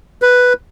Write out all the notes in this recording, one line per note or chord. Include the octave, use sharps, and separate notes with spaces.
B4